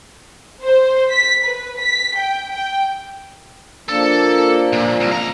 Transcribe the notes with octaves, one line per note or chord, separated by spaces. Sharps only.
C5
B6
B4
B6
G5
G5
F3 A#3 D4 A4
A#2
C2
C#2 A#5